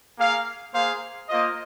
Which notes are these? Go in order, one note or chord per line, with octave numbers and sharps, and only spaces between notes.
A#3 G#4 F5
A#3 G#4 C5 F5
A#3 F4 C5 D#5